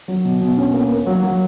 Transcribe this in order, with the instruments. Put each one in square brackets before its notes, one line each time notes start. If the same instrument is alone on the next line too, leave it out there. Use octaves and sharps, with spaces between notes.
[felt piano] F#3
B2
B2
C#4
A#3
A#3
F#3
F#3